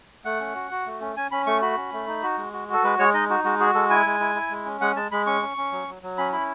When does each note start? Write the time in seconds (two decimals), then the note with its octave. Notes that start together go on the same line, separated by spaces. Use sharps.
0.25 A3 F#5
0.40 C#4
0.55 F#4
0.71 F#4
0.86 A3
1.01 C#4
1.17 C#4 G#5
1.31 C#4 B5
1.47 A3 C#6
1.62 F#4 B5
1.77 C#4
1.93 A3
2.07 D#4
2.23 F#4
2.38 G#3
2.53 F#4
2.68 F#4 A4
2.84 G#3 B4
2.99 G#3 C#5
3.14 D#4 D#5
3.29 D#4 F#4
3.44 G#3 F#4
3.59 F#4 G#4
3.74 G#3 A4
3.90 E4 G#5
4.06 G#3
4.20 E4
4.35 E4
4.50 G#3
4.65 C#4
4.81 G#3 F#5
4.96 G#3 A5
5.12 G#3 B5
5.26 C#4 C#6
5.41 C#4
5.57 C#4
5.72 F#3
5.88 F#3
6.03 F#3
6.18 C#4 B5
6.33 E4 B5